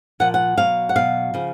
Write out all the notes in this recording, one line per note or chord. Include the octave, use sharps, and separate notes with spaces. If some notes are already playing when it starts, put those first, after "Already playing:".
A#2 F3 F#5
F#5
B2 F#3 F5
F#5
B2 F#3 F5
C#3 F3